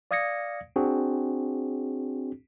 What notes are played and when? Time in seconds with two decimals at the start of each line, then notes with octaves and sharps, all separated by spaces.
0.11 D5 F5 D#6 G#6 A#6 C#7
0.76 C4 D4 F#4 G#4